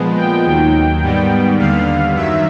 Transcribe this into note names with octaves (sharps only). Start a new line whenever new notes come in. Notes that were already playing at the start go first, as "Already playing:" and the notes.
Already playing: A#2 F3 G#3 B3
G5
D#2 D#3 F#3
G#2 D#3 G3 B3
D#2 D3 G3 B3 F5
F#2 D#3 F#3 E5